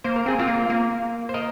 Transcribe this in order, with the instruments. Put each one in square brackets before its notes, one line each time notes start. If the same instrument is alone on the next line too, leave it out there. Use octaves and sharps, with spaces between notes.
[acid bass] A#3 [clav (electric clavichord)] C5
[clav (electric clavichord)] A#4
[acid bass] C4 [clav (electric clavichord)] G#4
[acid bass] C4 [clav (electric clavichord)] F4 A#4
[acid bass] A#3
A#3
[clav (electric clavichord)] C5
A#4 D#5